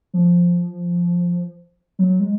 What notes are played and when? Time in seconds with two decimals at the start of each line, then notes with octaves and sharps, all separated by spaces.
0.14 F3
1.99 F#3
2.20 G#3